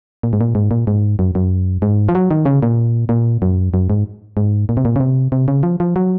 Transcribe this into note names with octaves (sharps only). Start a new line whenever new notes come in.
A#2
G#2
A#2
G#2
A#2
G#2
F#2
F#2
G#2
F3
F#3
D#3
C#3
A#2
A#2
F#2
F#2
G#2
G#2
A#2
C3
A#2
C#3
C3
C3
C#3
F3
F3
F#3